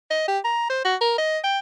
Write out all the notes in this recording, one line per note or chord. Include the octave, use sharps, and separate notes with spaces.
D#5
G4
A#5
C5
F#4
A#4
D#5
G5